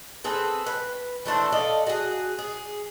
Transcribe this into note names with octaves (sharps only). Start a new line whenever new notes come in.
C4 G#4 A4 B4
B4
E3 A3 D4 C5
A4 D5 D#5 F5
F#4 G#4
G#4